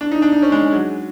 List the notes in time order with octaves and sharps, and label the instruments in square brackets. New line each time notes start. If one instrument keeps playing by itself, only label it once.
[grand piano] D4
D#4
D4
D#4
C#4
G#3
F#3